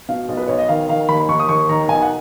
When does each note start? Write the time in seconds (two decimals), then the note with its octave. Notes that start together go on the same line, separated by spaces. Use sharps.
0.09 B2 F5
0.29 B1
0.37 B4
0.48 B1 C#5
0.58 D#5
0.69 D#3 F5
0.89 D#3 F5
1.09 D#2 B5
1.28 D#2 C#6
1.40 D#6
1.49 D#2 C#6
1.69 D#3 A#5
1.88 B1 G#5
2.02 F#5